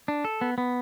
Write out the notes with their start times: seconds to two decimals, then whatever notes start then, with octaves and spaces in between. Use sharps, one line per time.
0.08 D4
0.25 A4
0.41 B3
0.58 B3